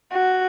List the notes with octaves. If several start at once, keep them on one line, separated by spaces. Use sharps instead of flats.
F#4